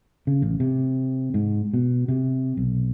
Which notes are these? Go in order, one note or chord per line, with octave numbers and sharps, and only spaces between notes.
C#3
A1
C3
G#2
B2
C3
B1